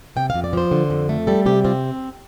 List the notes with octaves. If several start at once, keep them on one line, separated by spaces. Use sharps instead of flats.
C3 G5
F5
F2
D5
F3 C5
D3
F2
A3
G3 A4
C3 G4
C4 F4